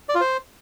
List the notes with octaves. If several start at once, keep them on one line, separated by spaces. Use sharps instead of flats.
D5
F4
C5